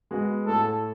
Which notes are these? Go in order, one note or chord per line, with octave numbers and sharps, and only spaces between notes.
G#3 B3 F#4
A2 A4